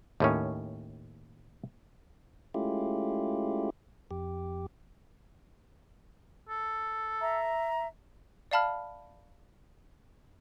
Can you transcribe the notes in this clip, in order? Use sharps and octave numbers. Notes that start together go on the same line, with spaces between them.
D#2 A2 C#4
G#3 A3 C#4 E4 F4 G4
F2 G4
A4
E5 A#5
D5 E5 F5 A5 B5 F6